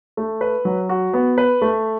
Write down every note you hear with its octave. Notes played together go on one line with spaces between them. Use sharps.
A3
B4
F#3
F#4
B3
B4
A3